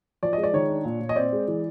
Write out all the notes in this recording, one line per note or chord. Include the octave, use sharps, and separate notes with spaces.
F3 D5
G#3 D#5
D5
D#3 C#5
D4
A#2
A#2
D#5
C4 D5
G#3
E3